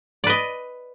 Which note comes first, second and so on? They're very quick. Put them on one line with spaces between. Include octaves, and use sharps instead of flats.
D5 B4 D#5